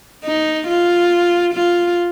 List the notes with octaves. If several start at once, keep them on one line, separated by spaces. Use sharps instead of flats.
D#4
F4
F4